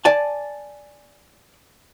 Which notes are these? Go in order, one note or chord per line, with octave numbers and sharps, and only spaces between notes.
D5 G#5 A5